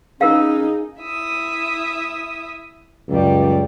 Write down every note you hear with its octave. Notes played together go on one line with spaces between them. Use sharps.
C#4 D#4 F4 G#4 A#4 F5
E4 E5 D#6
C#2 F#2 G3 D5